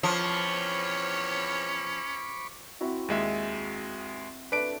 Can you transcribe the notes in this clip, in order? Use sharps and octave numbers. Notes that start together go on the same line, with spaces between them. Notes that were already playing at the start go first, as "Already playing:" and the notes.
E2 F3 C4 C#4 C#5 B5 C#6 D6
C4 E4 F#4
D#2 G#3 E5
A3 D4 B4 D7